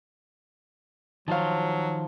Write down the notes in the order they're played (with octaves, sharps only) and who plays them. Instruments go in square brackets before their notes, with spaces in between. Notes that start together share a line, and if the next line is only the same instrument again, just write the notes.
[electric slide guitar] D#3 F3 C5 [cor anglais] F#3 [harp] F5 A5